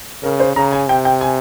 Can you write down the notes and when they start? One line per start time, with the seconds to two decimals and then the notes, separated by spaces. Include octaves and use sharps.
0.23 C#3 A#4
0.40 C5
0.56 C#3 A#5
0.72 G#5
0.89 C3 G5
1.05 G5
1.21 G#5